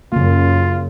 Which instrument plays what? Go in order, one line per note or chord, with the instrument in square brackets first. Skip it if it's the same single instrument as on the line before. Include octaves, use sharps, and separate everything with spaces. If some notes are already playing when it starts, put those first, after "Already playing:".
[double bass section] F#2 [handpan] C#3 A#3 [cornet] F4